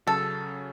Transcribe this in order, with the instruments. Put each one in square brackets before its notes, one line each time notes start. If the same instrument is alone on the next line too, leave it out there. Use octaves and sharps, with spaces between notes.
[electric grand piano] C#3 F#3 C#4 [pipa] A4